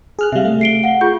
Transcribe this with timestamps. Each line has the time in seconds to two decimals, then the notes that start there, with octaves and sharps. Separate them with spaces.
0.19 G#4 F6 F#6
0.32 C3 G3 E5 F5
0.45 A3
0.61 C7 D7 G7
0.83 F5 F#5
1.01 F4 G#4 C#6 G6